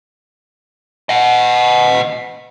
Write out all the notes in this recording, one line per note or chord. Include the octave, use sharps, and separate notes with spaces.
D#5 F#5